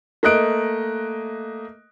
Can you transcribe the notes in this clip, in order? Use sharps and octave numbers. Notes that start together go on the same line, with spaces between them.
A3 A#3 D#5 F#6 D7